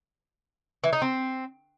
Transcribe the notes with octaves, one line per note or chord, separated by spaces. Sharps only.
E3
D#4
C4